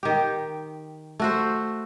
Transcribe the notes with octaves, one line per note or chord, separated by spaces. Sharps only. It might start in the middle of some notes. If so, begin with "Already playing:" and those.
D#3 G4
A3 F#4 C5